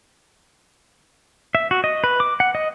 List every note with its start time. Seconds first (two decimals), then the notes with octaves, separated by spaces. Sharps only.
1.55 E5
1.71 F#4
1.84 D#5
2.04 B4
2.20 D6
2.40 F#5
2.55 D#5